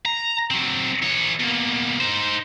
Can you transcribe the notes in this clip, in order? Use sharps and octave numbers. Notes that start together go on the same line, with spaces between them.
A#5
F#3 C4
E3 C#5
B2 A#3
D#4 C5